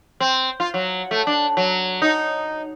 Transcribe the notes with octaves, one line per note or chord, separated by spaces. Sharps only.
C4
F4
F#3
A3
D4
F#3
D#4